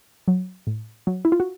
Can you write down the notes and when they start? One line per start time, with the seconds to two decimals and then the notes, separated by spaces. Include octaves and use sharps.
0.28 F#3
0.67 A2
1.07 F#3
1.25 E4
1.32 F4
1.40 F#4